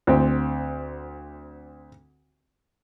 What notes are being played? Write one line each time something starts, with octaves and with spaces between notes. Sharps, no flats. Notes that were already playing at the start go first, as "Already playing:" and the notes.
D2 C4